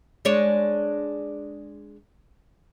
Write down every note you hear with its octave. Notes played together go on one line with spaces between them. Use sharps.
G#3 D4 C#5